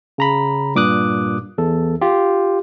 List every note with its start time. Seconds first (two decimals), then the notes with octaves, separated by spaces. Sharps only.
0.18 C#3 A#5 B5
0.75 G2 A#2 D6 D#6 F#6
1.58 E2 A4
2.01 F4 G4